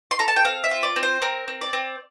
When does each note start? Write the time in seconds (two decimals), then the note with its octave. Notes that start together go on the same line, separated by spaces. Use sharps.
0.11 C6
0.19 A4 A#5
0.28 A5
0.36 G5
0.45 C4 F5
0.64 E5
0.71 F4
0.83 D5
0.96 C4
1.03 C5
1.22 C4 A#4
1.48 C4
1.61 D5
1.73 C4